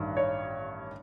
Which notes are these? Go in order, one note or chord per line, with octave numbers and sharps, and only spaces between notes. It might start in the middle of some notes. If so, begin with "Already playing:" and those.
Already playing: A1 G2 D#3
C#5